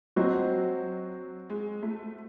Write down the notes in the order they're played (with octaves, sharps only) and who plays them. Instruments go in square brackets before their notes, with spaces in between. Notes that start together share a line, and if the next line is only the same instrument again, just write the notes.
[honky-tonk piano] F#3 [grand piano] C4 F#4 C5 D#5
[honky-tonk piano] G#3
A3